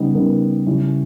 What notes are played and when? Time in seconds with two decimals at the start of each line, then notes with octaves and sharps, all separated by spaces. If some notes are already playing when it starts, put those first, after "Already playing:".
Already playing: C#3 G3 B3 D#4
0.14 C#3 G3 B3 D#4 A#4
0.66 C#3 G3 C#4 E4